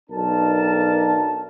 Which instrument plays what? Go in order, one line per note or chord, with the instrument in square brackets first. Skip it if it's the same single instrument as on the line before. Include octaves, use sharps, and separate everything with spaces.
[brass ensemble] B1 D4 A#4 A5